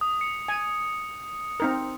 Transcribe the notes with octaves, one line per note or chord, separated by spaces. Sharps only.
D#6
C#7
G#5
C4 D#4 A#4